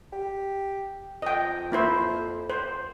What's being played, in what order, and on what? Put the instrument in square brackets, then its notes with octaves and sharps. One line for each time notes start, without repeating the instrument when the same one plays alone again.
[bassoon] G4
[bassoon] F2 [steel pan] D#5 G5
[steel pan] A#3 E4 C5
C5